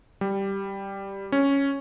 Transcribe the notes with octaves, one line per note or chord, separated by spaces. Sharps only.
G3
C#4